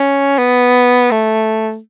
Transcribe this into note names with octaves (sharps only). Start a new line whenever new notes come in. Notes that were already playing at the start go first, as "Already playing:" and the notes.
Already playing: C#4
B3
A3